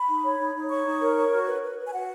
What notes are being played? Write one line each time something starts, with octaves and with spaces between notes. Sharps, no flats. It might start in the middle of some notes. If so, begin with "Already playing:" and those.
Already playing: B5
D#4
C#5
D#4
D#4
C#5 C#6
D#4
A#4
C#5
F#4
B4
B4
B4
G#5
F#4 F#5